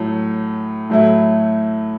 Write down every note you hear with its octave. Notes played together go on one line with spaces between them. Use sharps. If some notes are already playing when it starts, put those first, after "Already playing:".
Already playing: A2 F#3 A3
A2 F#3 A3 E4